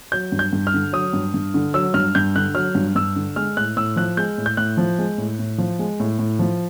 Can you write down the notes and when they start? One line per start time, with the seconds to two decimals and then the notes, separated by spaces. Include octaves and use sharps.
0.12 F#3 G6
0.32 G2
0.39 G6
0.53 G2
0.67 F6
0.74 D3
0.93 F#3 D#6
1.13 G2
1.34 G2
1.54 D3
1.74 F#3 E6
1.94 G2 F6
2.15 G2 G6
2.35 D3 F#6
2.55 F#3 F6
2.75 G2
2.95 G2 E6
3.16 D3
3.36 G#3 F6
3.57 A2 F#6
3.77 A2 E6
3.96 F3 F#6
4.17 G#3 G6
4.38 A2
4.46 G6
4.57 A2 F#6
4.77 F3
4.99 G#3
5.18 A2
5.39 A2
5.58 F3
5.79 G#3
6.00 A2
6.19 A2
6.39 F3